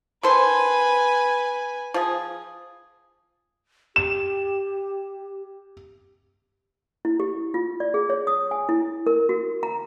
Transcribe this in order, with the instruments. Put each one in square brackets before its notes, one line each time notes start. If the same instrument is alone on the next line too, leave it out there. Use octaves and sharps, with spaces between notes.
[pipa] D#3 A4 C5 [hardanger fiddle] B4 G#5
[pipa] F3 G#4
[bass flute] G4 [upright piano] E7
[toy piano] E4
G4
F4
D5
G#4
C#5
D#6
G#5
E4
A#4
F#4
A#5